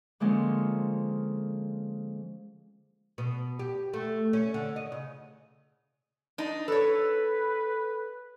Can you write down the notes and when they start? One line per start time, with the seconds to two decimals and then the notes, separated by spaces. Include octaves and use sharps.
0.20 D3 F3 G#3 A#3 C4 C#4
3.18 B2
3.59 G4
3.94 A3
4.33 C#4
4.54 D3
4.76 D#5
4.92 C#3
6.38 D4 D#4
6.68 A4 B4 C#5